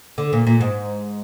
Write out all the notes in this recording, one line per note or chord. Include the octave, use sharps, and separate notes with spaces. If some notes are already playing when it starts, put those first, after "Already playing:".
D3
A#2
A#2
G#2